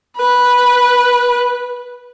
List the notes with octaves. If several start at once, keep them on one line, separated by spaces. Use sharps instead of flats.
B4